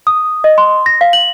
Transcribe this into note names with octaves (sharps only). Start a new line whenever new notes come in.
D#6
D#5
C6
A#6
F5
F#7